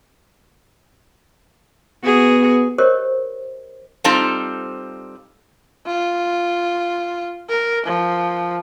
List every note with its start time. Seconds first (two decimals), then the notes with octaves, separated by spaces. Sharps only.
2.04 B3 F#4 G#4
2.78 G4 A#4 C5 C#5 D#5
4.04 G3 C4 D#4 F4 A4 C5
5.86 F4
7.49 A#4
7.86 F3